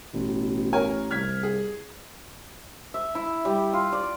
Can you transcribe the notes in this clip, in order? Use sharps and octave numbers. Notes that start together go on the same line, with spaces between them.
A1 B2
A#4 C#5 G#5
C2 F6 G#6 B6
G#4
E5
E4
G3
F4
D5